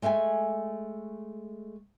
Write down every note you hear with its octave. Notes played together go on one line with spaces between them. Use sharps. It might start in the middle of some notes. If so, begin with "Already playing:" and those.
G#3 A3 E5 G5 G#5